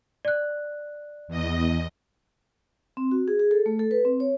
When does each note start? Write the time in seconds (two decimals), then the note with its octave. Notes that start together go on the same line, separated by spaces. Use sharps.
0.25 D5 F#6
1.28 E2 D#5
2.97 C4
3.11 F#4
3.28 G#4
3.40 G#4
3.51 A4
3.66 A3
3.79 A4
3.91 B4
4.05 C4
4.20 C#5